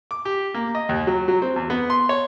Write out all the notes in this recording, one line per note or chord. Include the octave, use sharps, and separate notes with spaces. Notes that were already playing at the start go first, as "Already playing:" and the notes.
D6
G4
A#3
D#5
D#2
F#3
F#3
C4
E2
B3
C6
C#5